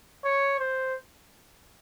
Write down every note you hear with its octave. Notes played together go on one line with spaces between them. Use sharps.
C#5
C5